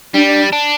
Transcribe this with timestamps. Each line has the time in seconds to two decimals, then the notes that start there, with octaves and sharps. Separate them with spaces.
0.15 G3 D4
0.53 D4